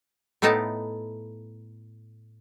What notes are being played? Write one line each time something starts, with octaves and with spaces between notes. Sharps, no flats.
A2 A3 B3 D#4 G5 A5